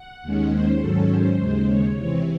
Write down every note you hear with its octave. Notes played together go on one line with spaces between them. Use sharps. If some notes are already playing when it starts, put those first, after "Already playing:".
Already playing: F#5
D#2 D#3 G#3 C#4
C5
G#2 D#3 F#3 C#4 A4
C5
D#2 C#3 G#3
C#5
C3 E3 C4